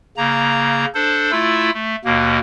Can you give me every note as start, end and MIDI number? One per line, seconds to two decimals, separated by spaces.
0.17 0.85 49
0.17 0.85 58
0.17 0.85 82
0.94 1.31 62
0.94 1.31 69
0.94 1.31 72
1.32 1.71 57
1.32 1.71 64
1.32 1.71 65
1.32 1.71 88
1.74 1.96 57
2.05 2.39 39
2.05 2.39 47
2.05 2.39 58